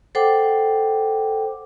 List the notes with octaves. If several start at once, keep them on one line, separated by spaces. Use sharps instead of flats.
A4 C5 F#5 G5 D6